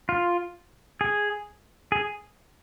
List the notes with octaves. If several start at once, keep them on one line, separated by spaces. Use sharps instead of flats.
F4
G#4
G#4